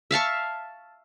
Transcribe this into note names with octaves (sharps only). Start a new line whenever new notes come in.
E5 F5 A5 C#6